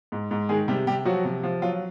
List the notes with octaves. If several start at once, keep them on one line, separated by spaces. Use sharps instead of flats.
G#2
G#2
D#3 G#3 G#4
C3 G3 G4
C3 G3 G4
F3 F#3 F#4
C3
F3
F#3 F4